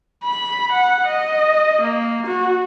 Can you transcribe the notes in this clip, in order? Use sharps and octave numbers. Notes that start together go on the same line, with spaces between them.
B5
F#5
D#5
A#3
F#4